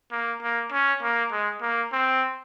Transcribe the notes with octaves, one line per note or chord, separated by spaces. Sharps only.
A#3
A#3
C#4
A#3
G#3
A#3
C4